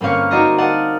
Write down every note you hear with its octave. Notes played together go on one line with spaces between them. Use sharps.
G1 A#3 C4 C#4 F5 C#6
D#4 F#4 C5 D5 D#5 A#5
A#4 D5 D#5 F5 F#5 A5